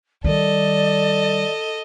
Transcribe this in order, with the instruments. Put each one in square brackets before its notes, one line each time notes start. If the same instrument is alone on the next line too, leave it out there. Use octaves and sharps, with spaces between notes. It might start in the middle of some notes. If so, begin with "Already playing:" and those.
[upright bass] D#3 G3 [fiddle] A4 D#5 [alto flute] D5